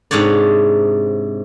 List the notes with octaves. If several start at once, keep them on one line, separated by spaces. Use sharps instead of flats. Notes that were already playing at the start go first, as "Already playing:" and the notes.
G#2 C3 D4 C#5 D5